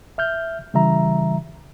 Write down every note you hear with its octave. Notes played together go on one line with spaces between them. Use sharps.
E5 F6 G6
C#3 E3 G3 E5 A#5